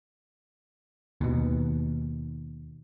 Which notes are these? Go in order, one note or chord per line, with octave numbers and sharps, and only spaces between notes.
D#2 B2